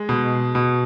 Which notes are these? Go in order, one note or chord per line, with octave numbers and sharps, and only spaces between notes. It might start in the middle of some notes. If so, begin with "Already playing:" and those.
Already playing: G#3
B2
B2